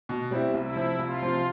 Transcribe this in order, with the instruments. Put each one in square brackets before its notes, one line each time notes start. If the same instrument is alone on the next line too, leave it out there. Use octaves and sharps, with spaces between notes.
[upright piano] B2
G3 C4 E4
[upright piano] C2 [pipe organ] E4
[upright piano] C3 F3
[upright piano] C2 [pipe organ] F4
[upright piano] C3 F3